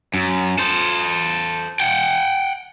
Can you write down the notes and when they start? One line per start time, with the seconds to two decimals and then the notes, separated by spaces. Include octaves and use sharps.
0.14 F#2
0.59 A4 C5
1.80 F#5 G5